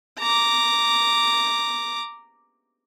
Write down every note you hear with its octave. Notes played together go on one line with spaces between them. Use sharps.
A#5 D6